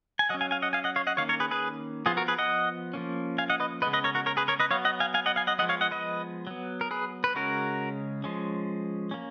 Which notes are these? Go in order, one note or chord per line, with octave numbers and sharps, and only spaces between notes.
G#5
F#3 C#4 D#5 F#5
F5 G#5
F5 G#5
D#5 F#5
F5 G#5
D#5 F#5
C#5 F5
D#5 F#5
D#3 A#3 C#4 C#5 F5
A#4 C#5
G#4 B4
G#4 B4
F3 B3 F4 G#4
F#4 A#4
G#4 B4
D#5 F#5
F3 A#3 C#4
F5 G#5
D#5 F#5
B4 D#5
C#3 G#3 B3 B4 D#5
B4 D#5
A#4 C#5
F#4 A#4
A#4 C#5
G#4 B4
A#4 C#5
B4 D#5
F#3 B3 C#5 F5
D#5 F#5
F5 G#5
F5 G#5
D#5 F#5
F5 G#5
D#5 F#5
F3 G#3 B3 D#5 F#5
C#5 F5
D#5 F#5
B4 D#5
F#3 B3
A#4
G#4 B4
B4
C#3 G#3 C#4 F#4 A#4
F3 G#3 C#4
A#3 C#4